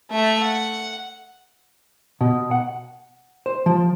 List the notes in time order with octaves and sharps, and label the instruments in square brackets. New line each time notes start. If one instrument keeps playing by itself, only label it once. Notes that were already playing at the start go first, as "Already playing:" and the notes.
[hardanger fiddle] A3 E5
F#5
[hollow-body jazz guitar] B2
F#5
C5
F3